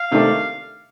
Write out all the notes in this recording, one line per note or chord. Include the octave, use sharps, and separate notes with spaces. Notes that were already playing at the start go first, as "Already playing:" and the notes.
Already playing: F5
C3 D#3 A3 D4